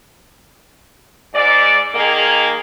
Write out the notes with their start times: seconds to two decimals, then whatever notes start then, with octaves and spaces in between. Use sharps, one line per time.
1.34 G#2 D5
1.95 D#3 A#3 G#4